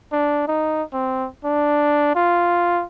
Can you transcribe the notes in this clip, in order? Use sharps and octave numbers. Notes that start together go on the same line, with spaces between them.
D4
D#4
C4
D4
F4